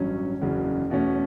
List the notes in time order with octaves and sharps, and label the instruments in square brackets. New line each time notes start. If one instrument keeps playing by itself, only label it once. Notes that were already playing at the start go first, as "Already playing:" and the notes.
Already playing: [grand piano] A1 G2 F#3 C#4
F#1 E2 C#3 F#3
E2 B2 A3 C#4